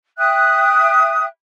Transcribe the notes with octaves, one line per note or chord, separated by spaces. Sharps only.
E5 G5 D#6 F#6